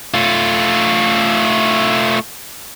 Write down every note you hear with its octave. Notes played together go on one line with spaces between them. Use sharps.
A3 F4